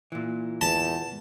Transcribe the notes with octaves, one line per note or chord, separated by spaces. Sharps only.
A#2 E3
E2 A5